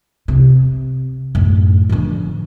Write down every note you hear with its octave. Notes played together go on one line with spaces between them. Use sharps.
C3
F#2 A2
D3 F3